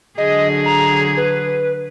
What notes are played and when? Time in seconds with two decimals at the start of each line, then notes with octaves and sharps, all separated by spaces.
0.18 D3 F#3 G#4 D#5
0.66 A#5
1.17 B4